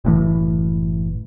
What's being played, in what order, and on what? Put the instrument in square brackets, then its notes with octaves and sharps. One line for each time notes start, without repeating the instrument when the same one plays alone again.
[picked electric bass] F#1 A2 E3